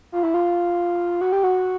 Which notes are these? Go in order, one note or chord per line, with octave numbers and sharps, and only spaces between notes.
F4
E4
F4
F#4
G4
F#4